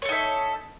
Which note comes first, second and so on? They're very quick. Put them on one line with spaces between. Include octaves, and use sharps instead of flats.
C#5 A4 D#4 E5